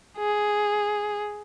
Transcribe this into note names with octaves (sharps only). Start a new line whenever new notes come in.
G#4